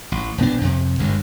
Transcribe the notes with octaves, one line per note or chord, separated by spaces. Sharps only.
A1
E1 A#1 B3 D4
F2 C3
G1 D2 G2 G#3